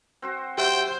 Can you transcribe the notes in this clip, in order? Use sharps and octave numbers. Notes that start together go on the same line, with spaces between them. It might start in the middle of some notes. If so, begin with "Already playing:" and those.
C4 F#4 C5
F#3 C4 G4 C5 E5 F#5 G5